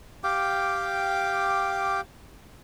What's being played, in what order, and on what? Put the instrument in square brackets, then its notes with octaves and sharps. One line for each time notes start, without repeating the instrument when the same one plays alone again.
[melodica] G4 F5 G5 D6